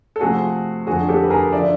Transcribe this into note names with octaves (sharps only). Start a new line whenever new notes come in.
A4
C3 F3 A3 C4 F#4 G#4
F2 D3 F3 F#4 G#4
G4 A4
B4
G#4 A#4
D3 F3 D5 E5